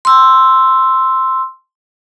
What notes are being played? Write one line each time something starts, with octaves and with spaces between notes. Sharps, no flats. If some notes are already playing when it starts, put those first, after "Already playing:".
C6 E6